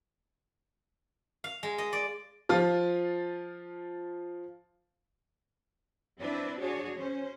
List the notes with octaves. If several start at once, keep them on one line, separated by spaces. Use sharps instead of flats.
F5
G#3
D#5
D5
F3 F4
C4 D4 E4 B4
D4 F#4 G#4 C#5
C#4 C5